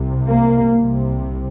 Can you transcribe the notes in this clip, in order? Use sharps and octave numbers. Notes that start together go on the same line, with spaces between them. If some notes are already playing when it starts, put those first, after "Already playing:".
Already playing: C2 C3
A#3
C2 C3